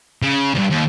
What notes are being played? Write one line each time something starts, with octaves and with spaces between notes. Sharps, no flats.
C#3
D2 G2
D#2